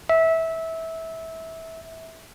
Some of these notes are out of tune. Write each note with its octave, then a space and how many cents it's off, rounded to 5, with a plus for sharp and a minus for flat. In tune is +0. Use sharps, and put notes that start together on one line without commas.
E5 -20